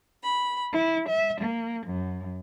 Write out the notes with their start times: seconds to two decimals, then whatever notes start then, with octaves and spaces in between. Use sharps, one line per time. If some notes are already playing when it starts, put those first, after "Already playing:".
0.23 B5
0.72 E4
1.09 E5
1.41 A#3
1.86 F#2